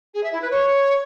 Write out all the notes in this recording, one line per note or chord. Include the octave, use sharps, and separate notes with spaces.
G#4
E5
E4
B4
C#5